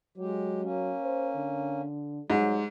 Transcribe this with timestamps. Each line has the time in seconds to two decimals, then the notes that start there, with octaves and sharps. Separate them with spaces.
0.17 F#3 G#3 G4
0.62 A#3 C#4
1.03 C5
1.36 D3
2.30 G#2 F#3 G3